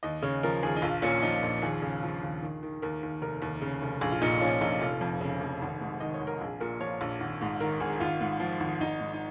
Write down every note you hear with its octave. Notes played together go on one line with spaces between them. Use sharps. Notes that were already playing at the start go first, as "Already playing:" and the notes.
D#2 D#5
C#3 C#5
F3 A#4
D#2 G#4
D#4
A#1 F4
A#2 C#4
F3 D#4
A#1
D#2 G#4
C#3
F3
D#2
D#3
D#3
D#2 A#4
D#2
F1 A#4
D#2
C#3
F1
A#1 G#4
F4
A#2 D#4
F3 C#4
A#1 D#4
F1 F4
F2
C#3
F1
G#1
G#2
D#3 D#5
C#5
G#1
A#4
A#1 G#4
A#2 A#4
F3 C#5
A#1
G#1
G#2
D#3 A#4
G#1 G#4
G#1 F4
G#2
F3
G#1
G#1 D#4
G#2
D#4